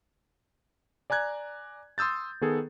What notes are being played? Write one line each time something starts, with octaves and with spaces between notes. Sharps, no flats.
D5 G#5 A#5 F#6 G#6
C6 D#6 E6 G6 A6
D#3 B3 G#4 A4